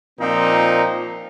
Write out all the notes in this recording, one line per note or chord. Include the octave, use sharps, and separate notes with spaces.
A#2 F3 C4 D#4